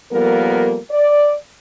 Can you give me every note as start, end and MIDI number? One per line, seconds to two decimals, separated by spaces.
0.11 0.77 53
0.11 0.77 55
0.11 0.77 58
0.11 0.77 59
0.11 0.77 69
0.11 0.77 70
0.90 1.34 74